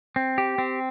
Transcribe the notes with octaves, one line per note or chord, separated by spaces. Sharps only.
C4
G4
C4